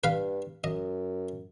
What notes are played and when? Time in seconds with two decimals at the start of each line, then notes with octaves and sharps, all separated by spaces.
0.04 G2 B4 F5
0.64 F#2 D#5